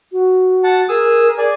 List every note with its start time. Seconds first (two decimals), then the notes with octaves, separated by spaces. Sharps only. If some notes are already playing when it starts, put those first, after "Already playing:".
0.12 F#4
0.64 F#5 A5
0.89 G#4 A#4 D#6 E6
1.38 G#4 D5 G#5